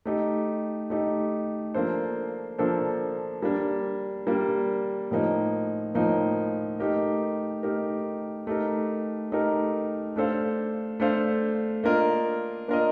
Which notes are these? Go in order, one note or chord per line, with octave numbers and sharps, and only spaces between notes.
A3 D#4 G4
A3 D#4 G4
F3 A#3 D4 A4 C5
F3 A#3 D4 A4 C5
G3 A#3 D4
G3 A#3 D4
A2 F3 A#3 D#4
A2 F3 A#3 D#4
A3 D#4 G4 A#4
A3 D#4 G4 A#4
A3 D#4 G4 A#4
A3 D#4 G4 A#4
A3 D4 A4 C5 F5
A3 D4 A4 C5 F5
A#3 D4 F4 A#4 D#5
A#3 D4 F4 A#4 D#5